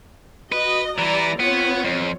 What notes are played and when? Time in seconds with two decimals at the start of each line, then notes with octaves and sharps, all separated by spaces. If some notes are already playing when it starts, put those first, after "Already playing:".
0.52 F#4 B4 D#5
0.98 E3 G3 E4 D5 A#5
1.40 B3 C4 F4 C#5
1.84 F2